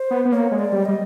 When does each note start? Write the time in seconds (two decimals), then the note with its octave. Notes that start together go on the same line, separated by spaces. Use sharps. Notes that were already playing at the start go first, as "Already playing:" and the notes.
Already playing: C5
0.11 B3
0.25 B3
0.32 A#3 C#5
0.52 G#3
0.59 D5
0.72 G3
0.86 G3 D#5